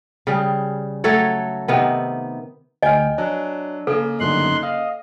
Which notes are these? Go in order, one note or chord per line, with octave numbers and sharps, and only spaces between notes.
C#3 G3 G#4
F#3 A3 A4 C#5
C3 D#3 B3
D2 D#5 G5 G#5 F6
F#3 D4
C#3 A#3 A4
G1 F#2 D4 D#4 C6 F#6
D#5 F5